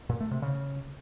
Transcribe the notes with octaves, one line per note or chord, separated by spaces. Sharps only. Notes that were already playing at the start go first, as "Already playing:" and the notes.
A#2
A3
C3
C#3